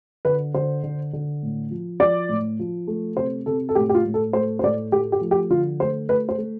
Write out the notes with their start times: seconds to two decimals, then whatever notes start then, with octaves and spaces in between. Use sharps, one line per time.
0.25 D3 B4
0.54 D3 C5
0.83 D3
1.13 D3
1.43 A2
1.71 F3
2.00 F3 D5
2.29 A2
2.59 F3
2.87 A3
3.17 C3 C5
3.46 C3 A4
3.69 A4
3.75 A2 G4
3.89 G4
3.94 F4
4.05 A2
4.14 A4
4.33 A3 C5
4.59 C5
4.63 A2 D5
4.92 A3 G4
5.12 G4
5.21 F3
5.31 G4
5.50 D3 F4
5.80 A3 C5
6.09 A3 B4
6.29 C5
6.38 A3